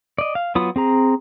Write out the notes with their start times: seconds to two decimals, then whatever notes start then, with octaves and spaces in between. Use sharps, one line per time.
0.18 D5 D#5
0.35 F5
0.55 F#3 B3 F4 B5 D#6
0.76 C4 G#4 A#5